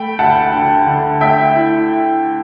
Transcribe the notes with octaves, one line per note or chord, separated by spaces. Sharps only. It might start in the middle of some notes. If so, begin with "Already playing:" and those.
Already playing: A3 G5 B5
D2 F#5 A5
D3
D3
A3 E5 G5
E4